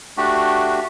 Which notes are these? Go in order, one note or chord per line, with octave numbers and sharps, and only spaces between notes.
A3 D4 F#4 G4